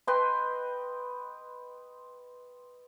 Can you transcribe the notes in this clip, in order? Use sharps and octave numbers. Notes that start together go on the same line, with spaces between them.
B4 D#5 G5 C6